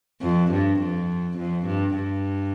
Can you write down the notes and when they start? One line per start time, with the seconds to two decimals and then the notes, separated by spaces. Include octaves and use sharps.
0.22 F2
0.51 G2
0.79 F2
1.38 F2
1.66 G2
1.95 G2